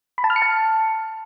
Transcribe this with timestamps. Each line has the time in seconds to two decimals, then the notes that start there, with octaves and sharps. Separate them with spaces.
0.18 B5
0.24 A5
0.30 F6
0.36 C#7
0.42 A5